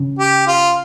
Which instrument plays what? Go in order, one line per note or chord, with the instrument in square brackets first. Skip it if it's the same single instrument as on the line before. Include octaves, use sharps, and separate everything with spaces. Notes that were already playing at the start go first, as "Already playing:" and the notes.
Already playing: [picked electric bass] C#3
[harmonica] G4
F4